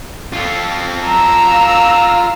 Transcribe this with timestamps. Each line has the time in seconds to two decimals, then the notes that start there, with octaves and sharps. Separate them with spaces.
0.33 F4 A4
1.03 A#5 E6
1.47 F5